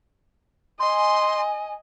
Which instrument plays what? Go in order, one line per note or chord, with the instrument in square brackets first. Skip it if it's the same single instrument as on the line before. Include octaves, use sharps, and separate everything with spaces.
[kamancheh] D#5 [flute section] G#5 [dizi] C6